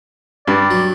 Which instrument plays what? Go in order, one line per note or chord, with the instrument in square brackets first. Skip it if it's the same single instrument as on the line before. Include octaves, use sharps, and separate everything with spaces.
[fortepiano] G2 [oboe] D5
[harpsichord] F#3